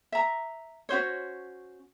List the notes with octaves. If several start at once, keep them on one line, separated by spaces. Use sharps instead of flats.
E5 A#5
C#4 F#4 C5 C#5